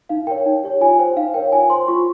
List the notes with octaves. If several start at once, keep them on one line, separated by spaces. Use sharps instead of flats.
D#4 F5
A#4 C#5 G5
D#4
G4 C#5
F4 G#5
C5 G5
D#4 F5
A#4 C#5 G5
F4 G#5
C5 C6
F4 C#6